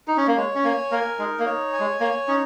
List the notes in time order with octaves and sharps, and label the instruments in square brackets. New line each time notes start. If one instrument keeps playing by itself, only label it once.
[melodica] D#4
C#4
A#3
[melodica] G#3 [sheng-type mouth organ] C#5
[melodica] C#4
[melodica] A#3 [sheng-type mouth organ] G#5
[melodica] A#3 [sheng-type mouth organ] A#4
[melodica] G#3 [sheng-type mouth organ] D#4
[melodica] A#3
[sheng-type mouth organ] C#5
G#5
[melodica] G#3
[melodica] A#3 [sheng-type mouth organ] C#5
[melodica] C#4 [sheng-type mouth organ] D#4